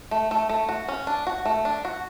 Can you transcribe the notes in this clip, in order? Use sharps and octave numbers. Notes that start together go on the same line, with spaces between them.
A3
A3
A3
F#4
C#4
D4
F#4
A3
D4
F#4